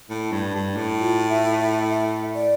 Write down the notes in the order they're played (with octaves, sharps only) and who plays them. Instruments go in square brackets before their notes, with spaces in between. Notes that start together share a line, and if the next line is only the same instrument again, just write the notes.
[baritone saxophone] A2
G2
G2
A2
[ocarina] F4
E5
E5
E5
D5